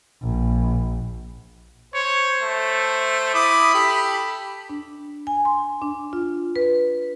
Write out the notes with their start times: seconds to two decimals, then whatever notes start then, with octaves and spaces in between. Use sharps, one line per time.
0.23 A#1
1.94 C5 C#5
2.41 A3
3.35 E4 B5 D6 D#6
3.75 G4 A4
4.70 D4
5.27 G#5
5.45 C6
5.82 D4
6.13 F4
6.56 B4